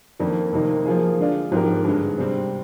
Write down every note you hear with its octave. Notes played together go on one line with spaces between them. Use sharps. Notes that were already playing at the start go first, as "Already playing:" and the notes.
F2 D#3 A#3 D4
F2 C3 D#3 A#3 D#4
F3 A#3 F4 G#4
D3 G#3 D4 F4
G#2 F3 C4 G4 A#4
G2 D3 G#3
C3 G3 C4